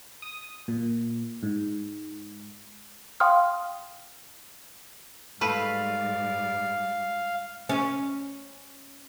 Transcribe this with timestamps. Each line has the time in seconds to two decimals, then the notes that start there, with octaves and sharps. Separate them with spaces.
0.22 D#6
0.68 A#2
1.43 G#2
3.20 F5 G5 C6 D#6 F6
5.41 G#2 G3 A3 B4 F5
7.69 C#4